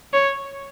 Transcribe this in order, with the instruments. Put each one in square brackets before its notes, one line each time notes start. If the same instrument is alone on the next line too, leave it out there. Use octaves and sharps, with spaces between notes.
[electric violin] C#5